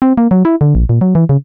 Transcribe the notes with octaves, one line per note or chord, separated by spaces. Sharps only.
C4
A#3
F#3
E4
D3
A#1
A#2
F#3
E3
C#3